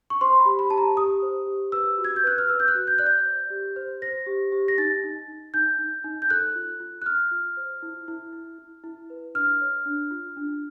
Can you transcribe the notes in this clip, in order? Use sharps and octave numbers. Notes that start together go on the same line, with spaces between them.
C#6
C5 C6
B5
G4
B5
G4 A5
A#5
G4 D#6
C5
G4
B4 E6
F#4
G#6
G6
B4 F#6
F6
B4 E6
G6
F#6
F#4
G6
D5 F#6
G6
C5
G4
C5
C5 A#6
G4
G4
A#6
D#4 A6
D#4
D#4
D#4 G6
D#4
D#4
G6
A4 F#6
F4
F4
F#6
F4 F6
F4
C5
E4
E4
E4
E4
E4
B4
D4 F6
C#5
D4
F4
D4